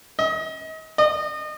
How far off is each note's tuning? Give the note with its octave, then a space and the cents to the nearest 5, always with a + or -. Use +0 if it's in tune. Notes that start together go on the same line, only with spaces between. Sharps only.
D#5 +35
D#5 -30